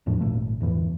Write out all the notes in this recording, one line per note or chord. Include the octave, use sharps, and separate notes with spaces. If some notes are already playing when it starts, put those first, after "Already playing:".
E2 A2 F3 D4
G#1 A#2 C#3 A3
G1 E2 A2 E3